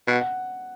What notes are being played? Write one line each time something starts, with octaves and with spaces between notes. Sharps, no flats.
B2 F#5
F#5